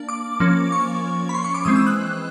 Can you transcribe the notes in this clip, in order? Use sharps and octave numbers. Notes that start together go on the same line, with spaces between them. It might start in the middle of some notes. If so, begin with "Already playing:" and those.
Already playing: A#3 D4
D6
F3 A#3 C#4
C#6
B5
C6
C#6
D6
E3 G#3 C4 D#6
E6
F#6